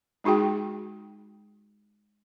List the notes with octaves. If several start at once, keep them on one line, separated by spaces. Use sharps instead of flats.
G#3 D#4 F#4 G#4 G5